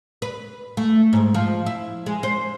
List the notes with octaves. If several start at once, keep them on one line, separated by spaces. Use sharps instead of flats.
B4
A3
G#2
F3
E4
G#3
C5